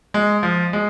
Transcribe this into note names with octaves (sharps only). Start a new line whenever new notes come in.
G#3
F3
G#3